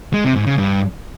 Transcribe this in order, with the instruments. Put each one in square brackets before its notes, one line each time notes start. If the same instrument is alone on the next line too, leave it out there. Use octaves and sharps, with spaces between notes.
[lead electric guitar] G#3
C3
G#2
C#3
G2